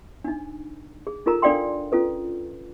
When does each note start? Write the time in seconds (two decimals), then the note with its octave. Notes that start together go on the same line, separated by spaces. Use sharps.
0.24 D4 D#4
1.07 G#4
1.26 D#4 F4 A4 A#4 A#5
1.42 D4 A4 D5 F5 G5 C6
1.92 C#4 F4 A4 B4